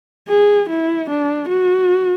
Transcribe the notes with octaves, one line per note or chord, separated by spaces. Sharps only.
G#4
E4
D4
F#4